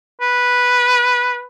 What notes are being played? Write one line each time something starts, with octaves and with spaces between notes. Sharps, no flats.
B4